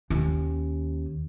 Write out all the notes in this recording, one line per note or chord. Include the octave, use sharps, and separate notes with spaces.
D#2 C#4